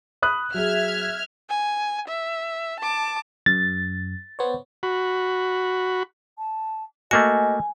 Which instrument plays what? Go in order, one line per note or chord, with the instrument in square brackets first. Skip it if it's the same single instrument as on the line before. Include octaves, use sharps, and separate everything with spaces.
[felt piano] B5 D#6 F#6
[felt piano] F#3 G#4 [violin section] E5 F6 G#6
[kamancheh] G#5
E5
A5 D6
[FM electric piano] F#2 [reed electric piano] A6
[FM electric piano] B3 C5 C#5
[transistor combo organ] F#4 B5
[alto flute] A5
[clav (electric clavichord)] A3 A#3 F#4 [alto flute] D#5 [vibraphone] G#5